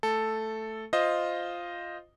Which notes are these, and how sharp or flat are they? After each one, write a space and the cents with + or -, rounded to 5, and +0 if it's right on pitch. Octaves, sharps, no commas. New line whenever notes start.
A3 +0 A4 +0
F4 +0 C5 +0 D#5 +0